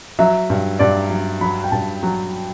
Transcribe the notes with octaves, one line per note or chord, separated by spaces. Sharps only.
F#3 E5
G2
G2 D5
F#3
F#3 B5
G5
G2 A5
F#3